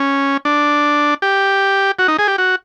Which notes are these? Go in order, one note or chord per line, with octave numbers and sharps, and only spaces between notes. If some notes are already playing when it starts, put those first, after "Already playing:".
Already playing: C#4
D4
G4
F#4
D#4
G#4
G4
F#4